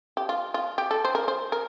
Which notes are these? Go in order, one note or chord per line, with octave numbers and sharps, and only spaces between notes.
G4
F4
F4
G4
A4
C5
A#4
C5
A#4